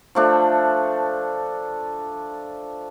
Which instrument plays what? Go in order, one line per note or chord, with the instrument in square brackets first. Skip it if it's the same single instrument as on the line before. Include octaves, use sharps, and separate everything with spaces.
[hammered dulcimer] F3 A3 D4